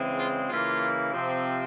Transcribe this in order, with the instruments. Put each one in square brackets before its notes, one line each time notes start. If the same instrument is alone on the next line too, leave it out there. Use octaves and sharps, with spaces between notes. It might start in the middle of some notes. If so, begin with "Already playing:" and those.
Already playing: [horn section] C#3 E3 G#3 C4
F4
C#3 E3 A#3 F4
C3 F3 C4